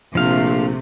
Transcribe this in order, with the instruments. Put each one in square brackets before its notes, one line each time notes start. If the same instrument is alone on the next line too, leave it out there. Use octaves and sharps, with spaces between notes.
[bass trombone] A#1 [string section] C3 A3 [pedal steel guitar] F3 F5